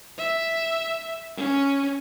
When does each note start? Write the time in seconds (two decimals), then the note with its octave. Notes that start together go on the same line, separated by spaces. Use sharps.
0.18 E5
1.37 C#4